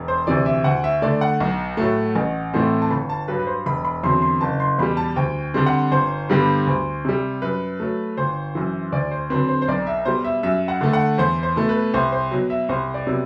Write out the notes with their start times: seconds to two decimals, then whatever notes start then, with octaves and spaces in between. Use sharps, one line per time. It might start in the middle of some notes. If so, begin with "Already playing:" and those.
Already playing: E1
0.08 C5
0.27 D2 C3 E3 D5
0.46 E5
0.64 D2 F#5
0.84 E5
1.02 D3 A3 D5
1.21 F#5
1.40 B1
1.77 A2 F#3 A3
2.16 A1
2.54 A2 E3 A3 C4
2.82 A5
2.90 G1 B5
3.10 A5
3.28 G2 F#3 B4
3.40 B4
3.47 C5
3.66 E1 B5
3.85 B5
4.04 E2 D3 F#3 C4 C6
4.22 C6
4.41 F#1 A5
4.60 C6
4.78 E2 B2 G3 B5
4.97 A5
5.16 D2 G5
5.54 D3 G3 C4
5.66 F#5
5.92 G1 C5
6.29 G2 D3 G3 B3
6.67 D2
7.05 C3 G3
7.42 F#2 B4
7.80 F#3 A3
8.17 G1 C5
8.55 F#2 E3
8.92 D2 D5
9.11 C5
9.30 D3 F#3 C4 B4
9.49 C5
9.62 C5
9.68 B1 D5
9.87 E5
10.05 B2 G3 C5
10.24 E5
10.43 F#2 E5
10.68 F#5
10.81 D3 A3
10.93 F#5
11.18 E2 C5
11.43 C5
11.56 B2 A3
11.69 B4
11.94 C2 C5
12.12 C5
12.31 B2 F#3
12.50 E5
12.69 C2 C5
12.94 D5
13.07 C3 F#3 B3